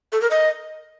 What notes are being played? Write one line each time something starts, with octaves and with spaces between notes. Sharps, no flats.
A4
A#4
D#5